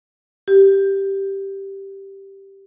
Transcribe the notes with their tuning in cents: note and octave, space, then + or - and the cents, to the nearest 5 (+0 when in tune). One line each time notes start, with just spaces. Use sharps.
G4 -5